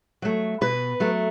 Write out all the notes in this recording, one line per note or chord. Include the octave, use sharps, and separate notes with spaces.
F#3 A3
B2 B4
F#3 A3